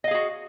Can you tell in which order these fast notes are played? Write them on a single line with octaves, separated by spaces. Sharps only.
D#5 F5 G#4 F#4